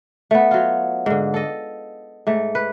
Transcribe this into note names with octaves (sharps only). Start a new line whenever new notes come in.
A3 B3
F#3 F4
G#2 D3
A4 D#5
G#2 A3
B4